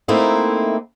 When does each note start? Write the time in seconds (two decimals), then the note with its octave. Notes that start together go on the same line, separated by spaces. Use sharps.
0.08 A3 A#3 C4 D#4 E4